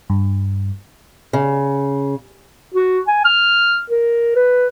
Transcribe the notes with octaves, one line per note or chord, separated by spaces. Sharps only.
G2
C#3
F#4
G#5
F6
A#4
B4